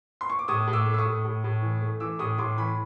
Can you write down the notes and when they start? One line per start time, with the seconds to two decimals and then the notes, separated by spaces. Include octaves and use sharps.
0.21 C6
0.30 C#6
0.39 D6
0.48 A2 C#6 D#6
0.67 A2
0.73 D6 E6
0.86 A3
0.94 E6
0.99 C#6 D#6
1.06 A2
1.25 A2
1.44 A2
1.62 E3
1.82 A3
2.00 E3 D6 E6
2.19 A2 C#6 D#6
2.38 A2 C6 D6
2.57 E3 B5 C#6